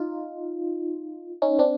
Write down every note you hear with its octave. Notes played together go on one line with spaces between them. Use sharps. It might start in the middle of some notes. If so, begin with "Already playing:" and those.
Already playing: D#4 F4
C#4 D#4
C4 D4